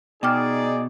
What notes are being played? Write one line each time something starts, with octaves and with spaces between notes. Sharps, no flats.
B2 D#4 G#4 D5 G5 D6 F6